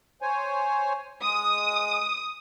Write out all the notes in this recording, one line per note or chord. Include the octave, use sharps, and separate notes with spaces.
C5 C#5 G#5
G#3 D#6